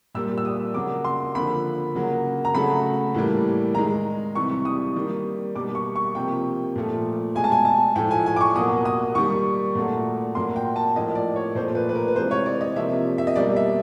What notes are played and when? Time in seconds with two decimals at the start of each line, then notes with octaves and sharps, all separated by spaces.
0.15 A#2 G3 A#3 E6
0.38 E6
0.45 D#6
0.74 C#3 F#3 A#3 D6
1.05 C6
1.35 D3 F3 A#3 B5
1.95 C#3 F#3 A#3
2.45 A#5
2.55 C#3 F#3 A3 B5
3.15 A2 E3 G3 A#3
3.75 D#3 G#3 A#5
4.35 C3 E3 G3 C#6
4.65 D#6
4.96 D#3 G3 A#3
5.56 B2 G3 A#3 D6
5.75 C#6
5.96 C#6
6.15 C3 F3 A#3 G5
6.76 A#2 F3 A3
7.35 B2 G#3 G#5
7.44 A5
7.52 G#5
7.65 A5
7.96 A2 F3 A3 G5
8.11 G#5
8.26 G#5
8.36 D6
8.41 C#6
8.56 B2 F#3 A#3 D#6
8.85 D#6
9.15 D#3 G3 A#3 C#6
9.75 A#2 F#3 A3
10.35 A#2 F#3 A#3 C6
10.56 G5
10.76 A5
10.96 A2 F3 A#3 D#5
11.15 D5
11.36 C#5
11.55 A#2 F3 A3 C5
11.75 B4
11.89 B4
11.95 A#4
12.08 B4
12.16 C3 E3 G#3 C5
12.31 C#5
12.46 D5
12.61 D#5
12.76 C3 F3 A#3 E5
13.18 E5
13.27 D#5
13.36 B2 G3 A#3 D5
13.56 E5